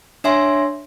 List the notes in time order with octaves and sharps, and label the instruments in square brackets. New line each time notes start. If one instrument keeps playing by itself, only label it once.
[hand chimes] D4 C#5 E5 G#5 C6